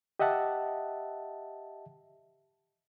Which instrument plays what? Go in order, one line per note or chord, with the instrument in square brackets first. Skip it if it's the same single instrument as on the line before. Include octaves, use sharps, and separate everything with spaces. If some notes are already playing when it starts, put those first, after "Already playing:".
[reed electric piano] G4 D#5 E5 F#5 A5